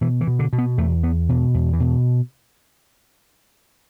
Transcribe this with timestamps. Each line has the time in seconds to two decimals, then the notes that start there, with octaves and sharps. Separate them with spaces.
0.01 B2 E3
0.21 E3
0.27 B2
0.39 D3
0.53 B2
0.58 B3
0.78 E2 A3
1.03 E2 B3
1.29 B2 E3
1.54 E2
1.73 E3
1.80 B2